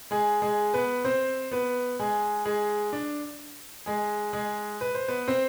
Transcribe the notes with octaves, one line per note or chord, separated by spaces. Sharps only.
G#3 G#4
G#3 G#4
B3 B4
C4 C5
B3 B4
G#3 G#4
G#3 G#4
D4
G#3 G#4
G#3 G#4
B4
C5
B3 B4
C4 C5